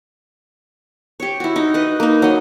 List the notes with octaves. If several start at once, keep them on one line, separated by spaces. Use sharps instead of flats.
G4 C#5
E4 F#4
D#4
B4 D#5
A#3 D#4
F#3 D#5